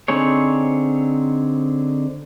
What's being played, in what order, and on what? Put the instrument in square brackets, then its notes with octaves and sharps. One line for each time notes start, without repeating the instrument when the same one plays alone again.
[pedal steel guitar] D3 C4 D#4 G#4 C#5